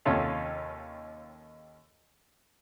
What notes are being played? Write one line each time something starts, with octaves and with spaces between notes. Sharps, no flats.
D#2 C3 C#4 F4 A4 F5